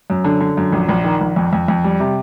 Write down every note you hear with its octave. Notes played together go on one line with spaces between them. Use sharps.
F#2
D3
D3
F#2
A#1
A#1
D#3
A#1
F2
F2
F2
G3
C3